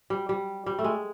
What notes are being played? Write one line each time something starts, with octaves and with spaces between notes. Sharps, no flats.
G3
G3
G3
A3
G#3